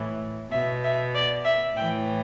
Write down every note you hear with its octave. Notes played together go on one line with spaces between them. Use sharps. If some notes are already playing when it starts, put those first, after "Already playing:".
Already playing: A2 E3
B2 E5
E5
D5
E5
A2 E3 G5